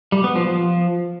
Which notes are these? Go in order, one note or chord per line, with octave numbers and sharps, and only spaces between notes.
G3
B3
F3
F3